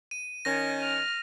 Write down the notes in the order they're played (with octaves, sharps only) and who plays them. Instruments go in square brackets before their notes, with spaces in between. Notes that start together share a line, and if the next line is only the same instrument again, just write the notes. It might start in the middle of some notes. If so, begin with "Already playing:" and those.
[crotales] D#7
[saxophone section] D#3 C#4 [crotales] A#6
[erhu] F6